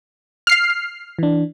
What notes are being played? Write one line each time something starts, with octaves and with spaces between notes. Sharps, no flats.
F6 C7
E3 D4